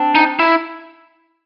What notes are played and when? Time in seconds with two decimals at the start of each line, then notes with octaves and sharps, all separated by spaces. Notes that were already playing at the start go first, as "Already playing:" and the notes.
Already playing: C4 D4
0.15 D#4
0.39 E4